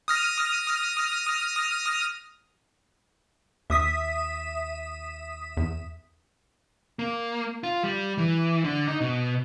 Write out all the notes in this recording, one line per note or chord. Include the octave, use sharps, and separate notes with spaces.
D#6 F6 A#6
D#2 E5 D#6 B6
E2
A#3
F4
G3
E3
D3
D#4
B2